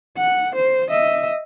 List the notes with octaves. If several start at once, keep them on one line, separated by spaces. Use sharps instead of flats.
F#5
C5
D#5 E5